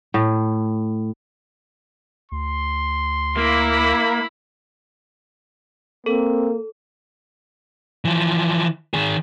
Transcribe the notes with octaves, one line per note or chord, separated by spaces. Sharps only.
A2
D2 C6
A#3 E4 B5
A#3 C4 A4
E3 F3
D#3 G#4